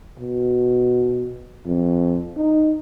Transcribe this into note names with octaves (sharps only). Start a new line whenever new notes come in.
B2
F2
D#4